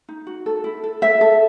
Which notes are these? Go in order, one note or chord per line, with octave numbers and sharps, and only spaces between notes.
D#4
F#4
A4
E4
A4
A4 E5
A4